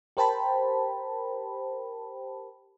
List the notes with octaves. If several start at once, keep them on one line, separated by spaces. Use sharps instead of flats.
G4 A#4 C5 G5 A5 B5